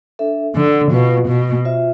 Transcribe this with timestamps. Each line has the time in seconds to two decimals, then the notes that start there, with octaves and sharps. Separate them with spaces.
0.19 D4 A4 E5
0.56 D3
0.92 B2 F4 B4 F5
1.28 B2
1.65 F4 C5 E5